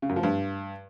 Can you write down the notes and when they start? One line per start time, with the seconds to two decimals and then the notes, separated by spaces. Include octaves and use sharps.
0.02 C#3
0.09 F#2
0.16 F3
0.23 G2